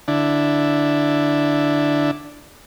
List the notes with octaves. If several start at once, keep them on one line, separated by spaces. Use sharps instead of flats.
D3 D4 E4